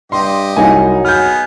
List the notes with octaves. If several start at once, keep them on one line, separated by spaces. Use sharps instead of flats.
G2 G4 D#5 C6
C2 F#3 D#4 G#5
B3 G#4 F6 G6